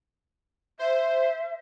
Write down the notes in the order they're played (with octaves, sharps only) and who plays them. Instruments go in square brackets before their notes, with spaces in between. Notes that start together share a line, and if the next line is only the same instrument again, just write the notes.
[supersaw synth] C5 [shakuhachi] E5